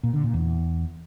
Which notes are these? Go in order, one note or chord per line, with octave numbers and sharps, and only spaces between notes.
A#2
D3
A#2
E2